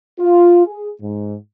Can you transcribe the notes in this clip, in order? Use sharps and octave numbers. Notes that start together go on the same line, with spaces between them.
F4
G#4
G#2